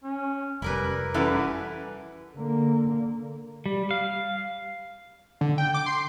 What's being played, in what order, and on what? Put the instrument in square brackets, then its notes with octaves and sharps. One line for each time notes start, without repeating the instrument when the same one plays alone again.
[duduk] C#4
[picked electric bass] F1 [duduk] G3 [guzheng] E4 A#4 B4
[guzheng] F#2 B4 [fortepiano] E3 E4 A4 [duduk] G3
[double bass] D3 A#3
[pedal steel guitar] G3
F5
[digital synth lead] D3
G5
D6
C6